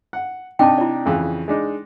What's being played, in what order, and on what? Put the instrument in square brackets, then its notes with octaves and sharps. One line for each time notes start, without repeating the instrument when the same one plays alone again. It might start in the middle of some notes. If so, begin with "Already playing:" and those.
[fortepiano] F#5
[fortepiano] C3 D4 D#4 [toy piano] G5 A5
[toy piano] E4 D5
[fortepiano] F2 C#3 E3
G#3 D4 D#4